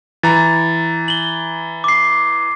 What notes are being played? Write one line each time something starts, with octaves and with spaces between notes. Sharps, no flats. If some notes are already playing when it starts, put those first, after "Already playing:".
E3 A#5 A6
F#7 G7
D6 C7